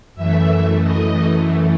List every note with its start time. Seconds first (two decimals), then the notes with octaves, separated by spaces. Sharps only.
0.15 F#2 E3 A3 E5
0.81 D#5